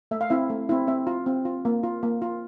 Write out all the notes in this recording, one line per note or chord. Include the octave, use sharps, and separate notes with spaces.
A3 E5
F5
C4 E4 E5
A3
C4 E4
C4 E5
F4
C4
F4
A#3
F4
A#3
F4